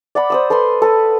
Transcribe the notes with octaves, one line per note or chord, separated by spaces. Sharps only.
D5 F#5 B5
C5 D#6 E6
A4 B4 B5 C6
A4 B4